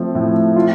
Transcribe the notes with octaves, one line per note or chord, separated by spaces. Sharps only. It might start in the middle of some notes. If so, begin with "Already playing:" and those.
Already playing: F3 A3 C4
A2
F4